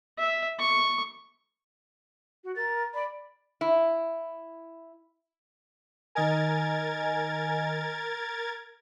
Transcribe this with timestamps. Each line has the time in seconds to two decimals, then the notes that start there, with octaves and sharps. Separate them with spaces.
0.18 E5
0.59 C#6
2.44 F#4
2.56 A#4 A6
2.94 D5 B5
3.61 E4
6.15 D#3 A#4 D#5 G#5 G#6 A6